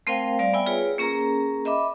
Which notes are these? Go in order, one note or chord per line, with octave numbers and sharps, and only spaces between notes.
A3 C4 A#4 C5 F5 G5
G3 D5 F5
B3 D5 E5 G5 G#5 E6
F4 G#4 B4 C#5
A#3 C#4 G#4 A#4 A#5
D#5 E5 B5 D6